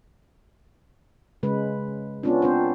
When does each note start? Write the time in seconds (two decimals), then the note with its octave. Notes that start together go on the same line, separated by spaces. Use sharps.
1.43 C#3 G#3 B4
2.23 B3 C#4 D4 F4
2.42 C4 D4 C5